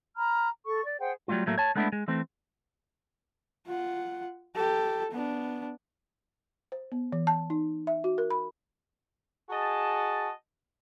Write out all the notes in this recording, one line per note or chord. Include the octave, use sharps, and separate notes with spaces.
A#5 B5 F6
A4 C#6
D5
G#4 C5 F#5 G5
F#3 G3 A3 A#3 F4
A2 F#3 A3 A#3
C#5 A5
G#3 A3 B3 D4 E4
G#3
E3 A3 C4
F4 F#5
G4 A4
B3 D4
C5
B3
E3
A5
D#4
E5
F#4
A#4
B5
F#4 G#4 D#5 A5